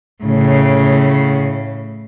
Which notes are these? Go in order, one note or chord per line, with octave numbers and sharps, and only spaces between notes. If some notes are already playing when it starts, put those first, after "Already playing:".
A2 C#3